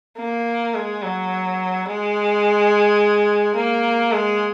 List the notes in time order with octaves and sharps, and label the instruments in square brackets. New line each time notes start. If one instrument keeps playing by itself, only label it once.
[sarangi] A#3
G#3
F#3
G#3
A#3
G#3